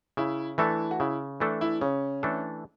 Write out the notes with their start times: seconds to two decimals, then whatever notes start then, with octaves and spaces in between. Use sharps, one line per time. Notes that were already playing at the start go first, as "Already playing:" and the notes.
0.17 C#3 E4
0.58 E3 A3 D4 E4 A4
0.91 F#4
1.00 C#3 E4
1.40 E3 A3 D4 A4
1.61 E4
1.81 C#3 C#4
2.23 E3 A3 D4 A4